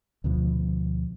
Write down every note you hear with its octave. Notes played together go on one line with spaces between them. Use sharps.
D2 B2 F3